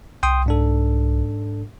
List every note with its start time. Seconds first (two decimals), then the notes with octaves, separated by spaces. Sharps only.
0.23 C2 G5 C6 D#6
0.46 G#2 D4 A4